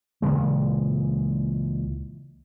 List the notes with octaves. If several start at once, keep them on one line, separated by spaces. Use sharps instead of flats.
C#2 A#2 E3 G#3